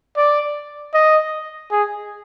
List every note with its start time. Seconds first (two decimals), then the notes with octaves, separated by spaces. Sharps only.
0.17 D5
0.94 D#5
1.71 G#4